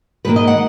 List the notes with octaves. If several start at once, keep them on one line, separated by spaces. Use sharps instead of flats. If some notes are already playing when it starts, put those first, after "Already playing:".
G#2 D#3 A#3 B4
D#5
F#5